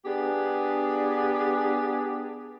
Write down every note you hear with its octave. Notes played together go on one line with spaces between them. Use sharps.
B3 D4 G4 G#4